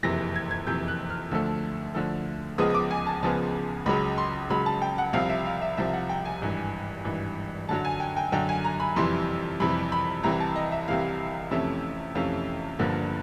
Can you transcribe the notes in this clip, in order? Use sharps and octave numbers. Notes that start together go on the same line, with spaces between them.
F#1 F2 C3 E3 A#6
G#6
G#6
F#1 F2 C3 E3 G6
F#6
F6
D2 D3 F3 A3 E6
D2 D3 F3 A3
C#2 C#3 F3 G#3 B3 D#6
D#6
D6
G#5
A5
C#2 C#3 F3 G#3 B3 A5
C#2 C#3 F#3 B5
C6
C#2 C#3 F#3 B5
A5
G5
F#5
C2 C3 F3 F5
E5
F5
E5
C2 C3 F3 E5
F#5
G5
G#5
G#1 G2 E3
G#1 G2 E3
F#2 D3 F#3 A5
G#5
G5
G5
F#2 D3 F#3 G5
G#5
A#5
B5
F2 C3 E3 G3 C6
F2 C3 E3 G3 B5
B5
C2 C3 E3 A#5
A5
D#5
E5
C2 C3 E3 F5
F2 C3 E3 A3 C#4 E5
F2 C3 E3 A3 C#4 F5
G1 G2 D3 F3 A#3